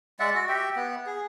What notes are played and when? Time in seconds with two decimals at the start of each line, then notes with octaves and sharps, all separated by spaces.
0.20 G#3 D5 E5 F#5
0.35 F#4
0.49 G4 E5 G5
0.76 B3
1.06 G#4